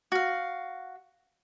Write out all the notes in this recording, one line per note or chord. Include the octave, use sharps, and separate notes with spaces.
F#4 F5